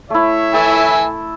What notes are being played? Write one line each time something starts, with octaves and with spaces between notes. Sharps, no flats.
A3 E4 C#5 E5
E4 A4 G#5 E6